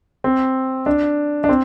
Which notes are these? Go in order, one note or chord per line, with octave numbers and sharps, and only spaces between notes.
C4
D4
D4
C4